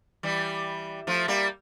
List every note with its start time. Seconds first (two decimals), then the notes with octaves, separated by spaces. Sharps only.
0.23 E3 G3
1.07 F3 A3
1.28 G3 A#3